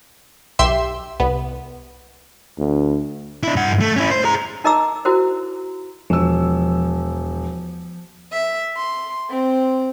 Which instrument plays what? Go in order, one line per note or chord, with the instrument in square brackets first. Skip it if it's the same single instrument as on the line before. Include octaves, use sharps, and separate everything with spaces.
[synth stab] B1 G4 E5 C6 E6
C2 B3
[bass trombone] D2
[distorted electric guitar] D4 E4
G2 F#5
A3
C#4 E4
C5
G#4 A#5
[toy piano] D#4 A#4 D#5 A#5 D6 E6
E4 F#4 A#4 C5
[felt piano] E1 E6 [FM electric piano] F3
[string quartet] E5
C6
C4